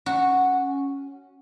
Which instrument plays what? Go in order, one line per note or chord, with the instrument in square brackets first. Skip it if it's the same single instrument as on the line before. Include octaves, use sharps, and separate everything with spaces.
[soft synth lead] C#4 [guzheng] F#4